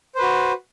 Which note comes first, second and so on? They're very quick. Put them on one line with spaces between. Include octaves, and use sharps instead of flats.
C5 B4 F#4